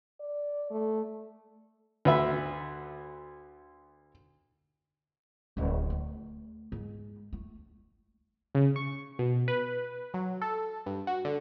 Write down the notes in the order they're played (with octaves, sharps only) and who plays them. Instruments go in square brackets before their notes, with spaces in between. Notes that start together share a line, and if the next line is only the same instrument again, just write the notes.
[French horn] D5
A3
[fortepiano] D2 B4 E5
[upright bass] D1 D2
A3
G#2
A3
[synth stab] C#3
C#6
B2
B4
F#3
A4
G2
F#4
D3